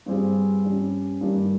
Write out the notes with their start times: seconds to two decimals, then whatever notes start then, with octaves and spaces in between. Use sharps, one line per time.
0.06 G2 G3 C4 F4 G#4
0.64 G2 G3 C#4
1.21 G2 D#3 G3